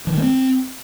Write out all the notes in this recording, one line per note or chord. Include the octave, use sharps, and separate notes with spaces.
E3
D#3
A3
C4